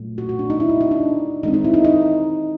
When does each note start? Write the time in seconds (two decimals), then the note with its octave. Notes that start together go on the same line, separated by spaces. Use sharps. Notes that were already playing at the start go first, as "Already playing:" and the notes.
Already playing: A#2 F#3 A3
0.18 F#4
0.29 F#4
0.39 D4
0.50 D#4
0.60 E4
0.70 D#4
0.81 D#4
0.91 D4
1.43 D#3 G#3 C4 D#4
1.54 D#4
1.64 E4
1.74 D#4
1.84 D#4